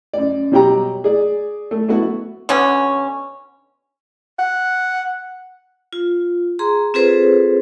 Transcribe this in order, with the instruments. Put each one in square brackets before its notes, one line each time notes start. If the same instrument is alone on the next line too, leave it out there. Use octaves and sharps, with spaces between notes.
[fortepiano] F#2 D5
B2 F#3 G3 G4 G5 A#5
G#4 D5
A3
A3 B3 E4 F#4
[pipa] B2 D3 C#4
[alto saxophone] F#5
[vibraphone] F4
G#4 A#5 C6
C4 F4 G#4 A4 B4 C5